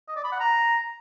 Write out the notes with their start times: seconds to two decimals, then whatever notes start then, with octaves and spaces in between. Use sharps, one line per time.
0.08 D#5
0.16 D5
0.24 B5
0.32 F#5
0.40 A#5